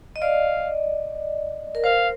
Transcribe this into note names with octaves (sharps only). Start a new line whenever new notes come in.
D#5
D5 F5
A#4
C5 F5